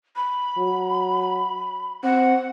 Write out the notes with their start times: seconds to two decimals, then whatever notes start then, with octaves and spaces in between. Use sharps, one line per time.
0.16 B5
0.58 F#3
2.04 C4 F#5